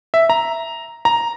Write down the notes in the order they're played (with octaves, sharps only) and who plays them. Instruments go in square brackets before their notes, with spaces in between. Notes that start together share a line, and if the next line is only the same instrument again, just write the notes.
[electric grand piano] E5
A#5
A#5